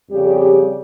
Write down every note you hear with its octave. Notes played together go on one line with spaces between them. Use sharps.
F2 C#3 G3 G4